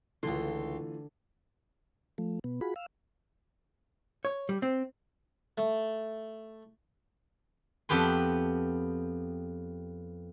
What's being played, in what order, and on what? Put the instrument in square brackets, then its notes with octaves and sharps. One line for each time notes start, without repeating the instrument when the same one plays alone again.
[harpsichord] C#2 C6 [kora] D3 [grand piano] E3 A3 F4
[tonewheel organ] F3 A3
B2 B3
F4 F#4 G#4 B5
F5 E6
[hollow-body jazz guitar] C#5
G3
C4
[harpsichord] A3
[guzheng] F2 B3 G4 B4 C6